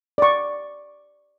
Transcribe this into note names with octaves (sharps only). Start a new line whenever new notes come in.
D5 C#6